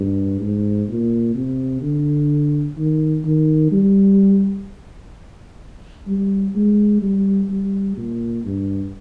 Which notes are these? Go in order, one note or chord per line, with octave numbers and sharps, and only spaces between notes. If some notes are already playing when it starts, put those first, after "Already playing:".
Already playing: G2
G#2
A#2
C3
D3
D#3
D#3
G3
G3
G#3
G3
G3
A#2
G2